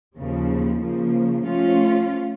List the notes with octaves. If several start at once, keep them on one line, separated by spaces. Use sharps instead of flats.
D#2 C#3 F3
C#3 F3 A#3
F3 A3 C#4 F4